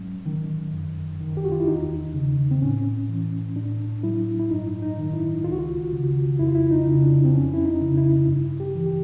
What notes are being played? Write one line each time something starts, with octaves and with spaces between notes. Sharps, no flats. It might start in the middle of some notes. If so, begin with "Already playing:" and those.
Already playing: G#2 F#3 C#4
D#3
F#2
D#3
G4
F#4
F4
E4
E2 D#4
C#3
C4
A2 C#4
E3
A2 D4
F#3 E4
E4
G2 D#4
D#4
D#3
E4
C#2 F4
F#4
F4
C#3
F2 E4
F4
E4
D#4
C#3
D4
C4
F2 C#4
E4
D#4
C#3
E4
G2
G4
E3
G4